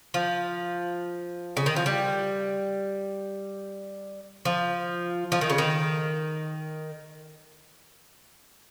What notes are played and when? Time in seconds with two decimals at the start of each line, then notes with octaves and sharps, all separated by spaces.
0.14 F3
1.57 C#3
1.66 D#3
1.76 F3
1.86 G3
4.45 F3
5.32 F3
5.41 D#3
5.50 C#3
5.58 D#3